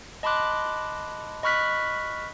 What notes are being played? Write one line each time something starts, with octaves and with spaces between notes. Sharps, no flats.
D#5 A5 B5 C6 D6 F#6
D#5 B5 C#6 F6 F#6 B6